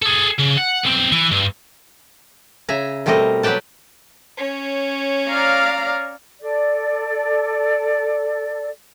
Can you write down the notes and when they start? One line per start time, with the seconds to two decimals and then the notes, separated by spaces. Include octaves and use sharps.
0.02 G#4 A4
0.38 C#3
0.57 F#5
0.83 B1 C4
1.12 E3
1.31 G2
2.69 C#3 E5 G#5 A#5
3.06 B2 G3 A3 C4 A#4 D#5
3.43 F#3 G4 B4 D5 G5 A5
4.37 C#4 C#5
5.28 D5 F5 A#5
6.41 A4 D5